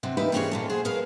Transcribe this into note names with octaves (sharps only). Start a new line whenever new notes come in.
C3 F#3 C4
E3 A#3 D#4 E4 G4 B4
E3 A#3 C4 C#4 G#4 C#5
A#2 G#3 A4
F#3 G#4 C5
G#4 A#4 B4 F5